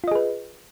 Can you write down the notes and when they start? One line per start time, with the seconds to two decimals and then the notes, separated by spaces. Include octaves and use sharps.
0.04 F4
0.08 D#5
0.11 G#4
0.15 B4